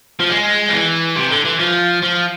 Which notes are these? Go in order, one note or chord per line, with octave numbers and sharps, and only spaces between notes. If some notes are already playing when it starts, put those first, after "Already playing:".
F3
G#3
F3
E3
C3
D3
E3
F3
F3